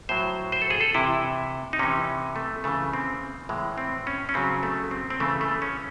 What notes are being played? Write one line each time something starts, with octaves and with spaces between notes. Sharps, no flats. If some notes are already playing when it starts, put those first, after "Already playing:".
A2 F#3 C5
C5
A4
G#4
A4
C3 E3 E4
D#4
C3 E3 C#4
A3
C#3 E3 A3
C4
A2 E3 G#3
C4
C#4
C#4
C#3 F#3 C4
A3
C4
C4
C#3 E3 A3
A3
C#4